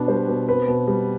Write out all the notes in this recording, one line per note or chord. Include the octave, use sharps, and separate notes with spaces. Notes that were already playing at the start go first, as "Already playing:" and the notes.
Already playing: B2 D4 B4
G3 C5
B2
C4 B4
B2
G3